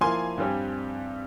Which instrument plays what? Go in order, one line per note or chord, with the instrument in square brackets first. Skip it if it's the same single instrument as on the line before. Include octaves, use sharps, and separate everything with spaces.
[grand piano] F3 A#3 E4 [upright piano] G#5 C6
[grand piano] G2 G3 C4 G4